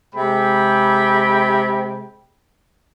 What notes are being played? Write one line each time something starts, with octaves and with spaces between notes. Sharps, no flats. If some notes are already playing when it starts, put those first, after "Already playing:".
C3 G#3 G5 B5